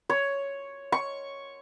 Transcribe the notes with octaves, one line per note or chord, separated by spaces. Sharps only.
C#5
C#6